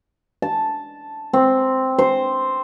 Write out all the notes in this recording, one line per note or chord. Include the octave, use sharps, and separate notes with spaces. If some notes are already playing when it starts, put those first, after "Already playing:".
A5
C4
C5